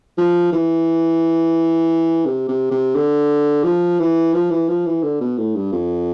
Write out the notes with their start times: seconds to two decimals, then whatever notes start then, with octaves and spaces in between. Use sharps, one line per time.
0.18 F3
0.53 E3
2.26 C3
2.49 C3
2.71 C3
2.95 D3
3.64 F3
3.99 E3
4.34 F3
4.50 E3
4.68 F3
4.86 E3
5.03 D3
5.21 B2
5.38 A2
5.55 G2
5.72 F2